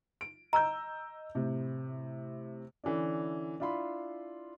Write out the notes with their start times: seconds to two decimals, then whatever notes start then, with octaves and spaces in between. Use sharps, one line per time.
0.21 D7
0.53 D#5 A#5 E6 G6
1.35 A2 C3
2.84 D3 E3 C#4 D4
3.60 D4 E4 F4 B5 C6